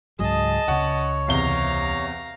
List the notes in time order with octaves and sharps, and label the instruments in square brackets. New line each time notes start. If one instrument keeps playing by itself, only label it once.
[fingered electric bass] C#2 G#2 F#3 [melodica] G#4 [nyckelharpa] D#5 A5
[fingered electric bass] C#2 C#3 [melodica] C#5 [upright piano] F#5
[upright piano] E2 C3 G7 [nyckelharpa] F5 A#5